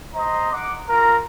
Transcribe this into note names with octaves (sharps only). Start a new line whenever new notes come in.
C5 D#5 A#5
F#5 D6
F4 A#4 A#5